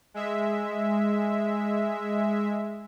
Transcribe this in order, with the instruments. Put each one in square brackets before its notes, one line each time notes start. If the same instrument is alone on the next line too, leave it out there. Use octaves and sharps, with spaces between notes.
[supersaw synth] G#3 E5